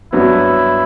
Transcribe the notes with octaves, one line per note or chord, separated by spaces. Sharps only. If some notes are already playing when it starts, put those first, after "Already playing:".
G2 F#3 B3 E4